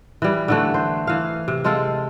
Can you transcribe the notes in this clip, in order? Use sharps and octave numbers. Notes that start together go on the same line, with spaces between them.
E3 G3
D3 E3 A3
C5
E3 F5
C3
G#3 C4 A4 F5